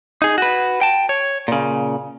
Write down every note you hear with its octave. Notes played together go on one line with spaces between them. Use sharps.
D#4 G#4
F#4 B4
G5 A5
C#5
A#2 C#3